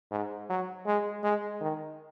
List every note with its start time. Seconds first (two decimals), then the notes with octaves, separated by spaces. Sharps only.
0.11 G#2
0.50 F#3
0.86 G#3
1.23 G#3
1.61 D#3